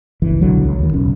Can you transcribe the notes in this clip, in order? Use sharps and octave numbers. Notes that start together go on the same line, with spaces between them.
G1 C#2 E3
B1 D3 F#3
C#2
D#2 D#3
E1 B1 C#3 C#4